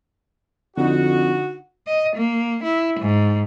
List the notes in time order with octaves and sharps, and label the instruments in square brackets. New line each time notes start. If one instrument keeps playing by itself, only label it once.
[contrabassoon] F2 [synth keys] D3 D#4 [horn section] F#4
[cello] D#5
A#3
E4
G#2